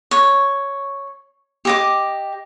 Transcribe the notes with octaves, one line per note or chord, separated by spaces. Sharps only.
C#5
G4 D#5 D6